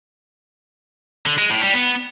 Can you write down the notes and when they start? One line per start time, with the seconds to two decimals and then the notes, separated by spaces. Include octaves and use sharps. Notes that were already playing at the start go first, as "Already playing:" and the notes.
1.26 D3
1.38 G#3
1.50 A2
1.62 G3
1.74 B3